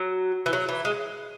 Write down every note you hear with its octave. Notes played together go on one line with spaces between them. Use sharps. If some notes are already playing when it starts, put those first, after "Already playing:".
Already playing: F#3
E3
F#3
E3
G#3